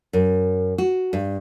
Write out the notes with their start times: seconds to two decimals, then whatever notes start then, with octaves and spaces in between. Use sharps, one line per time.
0.13 F#2
0.78 F#4
1.13 G2